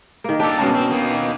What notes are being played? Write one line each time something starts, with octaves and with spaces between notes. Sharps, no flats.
D#3 A#3
D4 G4 A4
B2 G#3 A#3 C#4 A5
C4
D#3 A#3